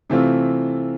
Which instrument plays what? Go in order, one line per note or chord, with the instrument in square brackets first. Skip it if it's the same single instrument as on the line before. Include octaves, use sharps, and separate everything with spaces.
[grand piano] C3 E3 A3 C4 F4